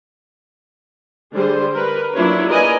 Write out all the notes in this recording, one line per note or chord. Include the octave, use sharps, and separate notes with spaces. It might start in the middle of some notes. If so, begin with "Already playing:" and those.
D3 G3 G#4 C5
A#4 B4
F#3 A#3 D4 E4 F4 C#5
A#4 B4 D5 D#5 G#5 A#5